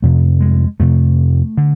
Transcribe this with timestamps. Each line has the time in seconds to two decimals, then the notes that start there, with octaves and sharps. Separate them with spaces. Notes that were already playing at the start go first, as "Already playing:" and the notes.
0.02 F2 C3 A3
0.41 G#3
0.80 F2 C3 A3
1.57 D3